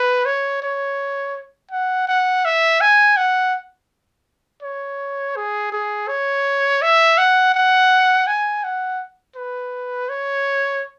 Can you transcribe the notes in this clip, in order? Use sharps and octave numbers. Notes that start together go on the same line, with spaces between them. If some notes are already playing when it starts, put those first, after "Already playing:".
Already playing: B4
C#5
C#5
F#5
F#5
E5
G#5
F#5
C#5
G#4
G#4
C#5
E5
F#5
F#5
G#5
F#5
B4
C#5